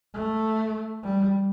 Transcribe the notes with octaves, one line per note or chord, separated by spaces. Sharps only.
A3
G3